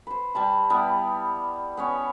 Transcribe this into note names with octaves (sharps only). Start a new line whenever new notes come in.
B4 C5
G3 A5 B5
G3 B3 E4
B3 C#4 C#5